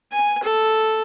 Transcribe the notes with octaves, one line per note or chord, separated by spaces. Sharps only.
G#5
A4